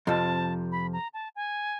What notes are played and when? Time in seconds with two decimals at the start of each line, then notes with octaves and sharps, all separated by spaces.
0.07 F2 C3 F3 A5
0.72 B5
0.93 A#5
1.14 A5
1.36 G#5